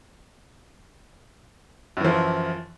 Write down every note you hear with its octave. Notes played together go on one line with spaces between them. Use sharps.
F#2 E3 F3